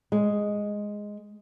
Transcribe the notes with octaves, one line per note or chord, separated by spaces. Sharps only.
G#3